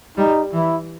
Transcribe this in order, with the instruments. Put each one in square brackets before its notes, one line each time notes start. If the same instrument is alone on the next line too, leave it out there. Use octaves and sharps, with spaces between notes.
[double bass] G3 [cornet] D#4
[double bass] E3 [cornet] E4